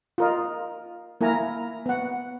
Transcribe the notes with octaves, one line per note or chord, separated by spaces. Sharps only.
F4 A#4 D#5
A#3 E4 A#4 G#5 A#5
B3 F#5